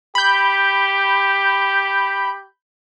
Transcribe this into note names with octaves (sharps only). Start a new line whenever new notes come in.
G4 B5 G6